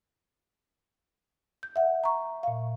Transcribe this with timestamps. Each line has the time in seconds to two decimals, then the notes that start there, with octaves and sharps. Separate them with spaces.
1.63 G6
1.76 E5 F#5
2.04 A#5 C#6
2.43 A#2 F5